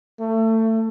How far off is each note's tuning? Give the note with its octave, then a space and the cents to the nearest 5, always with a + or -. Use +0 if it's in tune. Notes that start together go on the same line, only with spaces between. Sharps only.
A3 +25